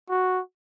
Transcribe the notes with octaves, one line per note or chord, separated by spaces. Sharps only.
F#4